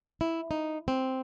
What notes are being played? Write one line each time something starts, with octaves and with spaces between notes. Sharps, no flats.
E4
D#4
C4